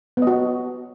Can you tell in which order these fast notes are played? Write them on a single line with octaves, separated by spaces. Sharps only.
B3 D#5 F#4